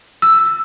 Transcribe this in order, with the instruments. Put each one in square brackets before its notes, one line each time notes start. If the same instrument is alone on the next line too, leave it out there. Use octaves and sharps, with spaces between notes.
[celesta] E6